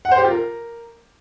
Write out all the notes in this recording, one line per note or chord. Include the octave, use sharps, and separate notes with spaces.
F#5
C5
G4
F4
A#4